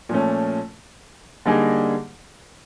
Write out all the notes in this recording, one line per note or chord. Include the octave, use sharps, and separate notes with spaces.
A#2 F3 A3 C#4
D3 G3 A#3 D#4 G#4